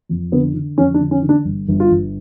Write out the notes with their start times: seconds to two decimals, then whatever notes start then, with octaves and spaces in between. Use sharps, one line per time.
0.09 F2
0.32 D3 B3
0.54 D3
0.78 F2 C#4
0.94 D4
1.00 D3
1.11 C#4
1.23 D3
1.29 D4
1.45 G1
1.68 G1
1.80 F4
1.91 G1